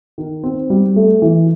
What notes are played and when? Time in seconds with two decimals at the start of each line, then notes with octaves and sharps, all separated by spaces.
0.18 D#3
0.43 C4
0.70 G3
0.96 A3
1.22 E3